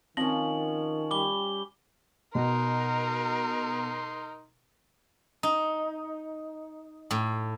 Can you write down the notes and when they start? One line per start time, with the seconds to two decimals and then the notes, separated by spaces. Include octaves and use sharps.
0.17 D#3 F3 C4 C#4 F#7
1.11 G3 D6 G7
2.35 B2 D#4 A#4 C6
5.43 D#4
7.11 A2